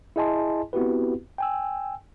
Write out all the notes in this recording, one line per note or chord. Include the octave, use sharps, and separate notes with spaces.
E4 G#4 D#5 G#5 A5 C6
B3 C4 E4 F#4 G4 B4
G5 G#5 E6